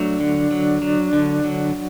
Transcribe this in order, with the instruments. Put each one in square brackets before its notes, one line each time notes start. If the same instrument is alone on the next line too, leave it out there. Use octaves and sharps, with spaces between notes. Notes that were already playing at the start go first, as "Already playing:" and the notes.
Already playing: [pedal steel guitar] F#3 A3 [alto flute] D4
[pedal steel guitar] D3
F#3
F#3
D3
F#3